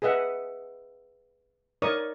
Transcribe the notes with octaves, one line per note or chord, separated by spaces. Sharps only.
G#4 B4 D#5 E5 F#5
D#4 A#4 C#5 D5 C#6 D#6